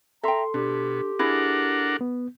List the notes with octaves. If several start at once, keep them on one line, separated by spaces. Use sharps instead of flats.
A4 E5 G5 A#5 C6
B2 D4 G4
D4 E4 G#4 A#4 F#5
B3